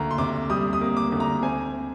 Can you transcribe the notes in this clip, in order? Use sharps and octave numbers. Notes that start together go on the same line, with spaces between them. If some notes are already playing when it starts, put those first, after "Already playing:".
Already playing: D2 A#3 A#5
C6
C3 D6
G3 D#6
D#6
A#3
D6
D2
A#5
C4 G#5